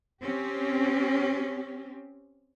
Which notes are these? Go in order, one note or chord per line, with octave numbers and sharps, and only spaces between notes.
C4 C#4 G4